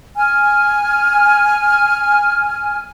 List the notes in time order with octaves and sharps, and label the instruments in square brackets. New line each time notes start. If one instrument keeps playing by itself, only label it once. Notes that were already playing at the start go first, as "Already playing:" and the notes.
[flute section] G#5 F6